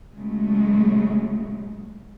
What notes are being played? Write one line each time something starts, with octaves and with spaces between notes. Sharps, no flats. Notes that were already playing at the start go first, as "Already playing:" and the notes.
A#2 C#3 F#3 G#3 A3